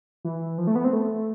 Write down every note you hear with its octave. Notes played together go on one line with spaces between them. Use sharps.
E3
F3
A3
B3
C4
A3